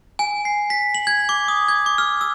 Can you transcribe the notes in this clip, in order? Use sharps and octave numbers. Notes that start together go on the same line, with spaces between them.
G#5
C7
B6
F#7
G#6
D6
D#6
G#6
D6
F6
E6